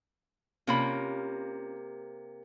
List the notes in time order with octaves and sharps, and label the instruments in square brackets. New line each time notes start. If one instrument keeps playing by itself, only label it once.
[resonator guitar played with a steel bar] C3 A#3 [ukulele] C#4 F4 B5